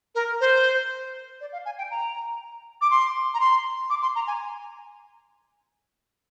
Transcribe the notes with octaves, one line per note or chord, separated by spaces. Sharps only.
A#4
C5
D5
F5
G#5
G5
A#5
D6
C6
A#5
C6
D6
C6
A#5
G#5